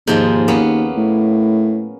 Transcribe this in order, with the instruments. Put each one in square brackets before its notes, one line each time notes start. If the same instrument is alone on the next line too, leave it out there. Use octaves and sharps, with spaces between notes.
[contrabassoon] D#2 [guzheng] G#2 F3 G#3
[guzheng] A#3 B3 C#4
[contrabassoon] A2